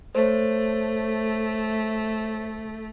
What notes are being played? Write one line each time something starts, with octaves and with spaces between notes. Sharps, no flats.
A3 C5 C#5